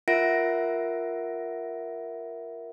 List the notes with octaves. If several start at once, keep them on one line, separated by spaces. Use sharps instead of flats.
F4 A#4 E5 F#5 A#6 D7